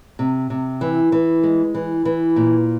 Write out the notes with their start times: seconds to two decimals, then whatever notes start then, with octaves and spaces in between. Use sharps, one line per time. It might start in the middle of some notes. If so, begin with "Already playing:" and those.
0.19 C3
0.50 C3
0.81 E3
1.12 E3
1.43 G#3
1.74 E3
2.05 E3
2.36 A#2